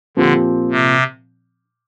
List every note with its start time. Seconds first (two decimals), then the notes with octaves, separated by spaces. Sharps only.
0.17 A#2 D3 F3 C4 G4
0.71 C3